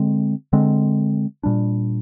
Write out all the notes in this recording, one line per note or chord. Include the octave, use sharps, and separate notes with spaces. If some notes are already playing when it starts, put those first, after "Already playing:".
Already playing: D3 G#3 C4
D3 G#3 C4
A#2 G3 D4